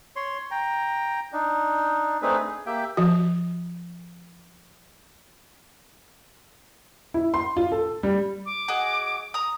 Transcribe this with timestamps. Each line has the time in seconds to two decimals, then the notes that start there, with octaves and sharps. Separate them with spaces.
0.16 C#5 C6
0.51 G5 A#5
1.33 D4 D#4
2.22 A3 C4 D4 D#4 G#4 B4
2.39 G#4
2.66 A#3 G4 E5 G5
2.97 F3 F#4
7.14 E4
7.34 C6
7.57 F4
7.72 A4
8.03 G3
8.46 D6
8.68 F#4 G#4 D#5
9.34 A#5 D#6